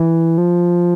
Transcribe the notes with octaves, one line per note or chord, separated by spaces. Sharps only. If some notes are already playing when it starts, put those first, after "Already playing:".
Already playing: E3
F3